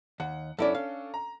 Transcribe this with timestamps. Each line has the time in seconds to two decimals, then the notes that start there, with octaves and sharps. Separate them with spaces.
0.20 D#2 F#5
0.59 F#2 C#4 D4 E4 A4 D5
0.75 F5
1.14 A#5